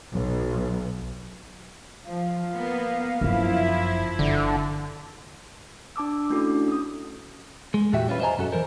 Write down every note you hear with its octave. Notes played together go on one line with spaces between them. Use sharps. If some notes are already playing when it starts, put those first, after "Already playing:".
B1
F3 F5
A#3 B3
G1 F#2 F3 E4
G1 D3
D4 A5 D6 E6
A3 C#4 D4 E4 F#4 A4
C#4 D#6
G#3
E2 A#2 E3 F#4 G4 E5
G3 C#4 F4 B4
C5 D#5 E5 G#5 A#5
B1 F#2 C#4 F#4 A4
E3 F3 A#4 C5